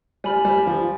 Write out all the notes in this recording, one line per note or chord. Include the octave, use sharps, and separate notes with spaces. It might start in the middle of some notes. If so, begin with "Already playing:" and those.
G3 D5 G#5 B5 F6
G3
F3